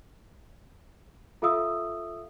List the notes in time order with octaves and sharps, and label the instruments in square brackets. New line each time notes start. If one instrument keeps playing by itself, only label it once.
[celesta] F4 A4 E5 F5 D#6 E6